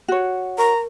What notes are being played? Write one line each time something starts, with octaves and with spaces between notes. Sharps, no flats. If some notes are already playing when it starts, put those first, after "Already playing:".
F#4 C#5
A#4 A#5 C#6